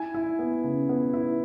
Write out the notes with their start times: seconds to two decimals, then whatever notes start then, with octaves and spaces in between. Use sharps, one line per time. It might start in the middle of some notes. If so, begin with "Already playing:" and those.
Already playing: E4 G#5
0.14 E4
0.39 B3
0.64 C#3
0.89 B3
1.14 E4